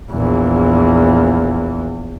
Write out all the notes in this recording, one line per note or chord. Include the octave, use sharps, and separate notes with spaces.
A#1 E2